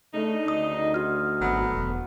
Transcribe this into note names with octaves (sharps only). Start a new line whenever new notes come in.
C#3 A3 D4 D#4
D2 D#6
F#4 F6
G#1 F#3 A3 B3
E1